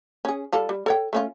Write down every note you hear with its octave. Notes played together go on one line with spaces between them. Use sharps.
C#4 G#4
G3 F4 A4
G3
A4 C#5 G5
A3 C#4 F4